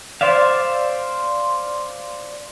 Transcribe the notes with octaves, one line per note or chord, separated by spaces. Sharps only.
C5 D5 E5 F5